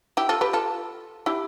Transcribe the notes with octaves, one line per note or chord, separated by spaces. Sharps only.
E4 G4
F4 A4
G4 B4
F4 A4
E4 G4